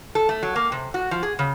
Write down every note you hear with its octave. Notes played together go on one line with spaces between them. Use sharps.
A4
A3
F#3
A#3
C3
F#4
F3
G#4
C#3